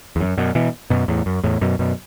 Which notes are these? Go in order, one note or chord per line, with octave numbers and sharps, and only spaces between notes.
E2
F#2
F#2 B2
B2 E3
F#2 B2
E2 A2
F#2
E2 A2
F#2 B2
F#2 B2